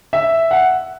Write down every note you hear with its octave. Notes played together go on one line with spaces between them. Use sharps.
E5
F#5